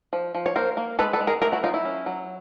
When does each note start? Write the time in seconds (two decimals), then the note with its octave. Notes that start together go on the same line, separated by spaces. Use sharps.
0.13 F3
0.34 F3
0.46 C#5
0.56 A#3 A#4 C5
0.77 A#3
0.99 G#3 A4 B4
1.13 A4 B4
1.20 G#3
1.27 G#4 A#4
1.42 A3 G#4 A#4
1.52 E4 F#4
1.63 F#3 D#4 F4
1.74 E4
1.85 C#4
2.06 F#3